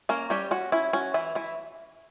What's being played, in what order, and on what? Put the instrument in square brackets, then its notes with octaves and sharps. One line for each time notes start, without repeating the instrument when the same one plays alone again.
[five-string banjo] A#3 C#4 A#4
G3 C#4 G4
C#4 F#4
C#4 E4
C#4 F#4
E3 E4
E3 E4